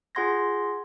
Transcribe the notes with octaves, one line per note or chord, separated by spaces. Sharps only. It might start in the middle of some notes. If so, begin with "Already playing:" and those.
F4 G#4 F#5 C6 G#6 A#6